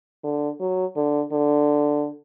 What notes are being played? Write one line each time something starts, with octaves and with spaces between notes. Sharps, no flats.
D3
F#3
D3
D3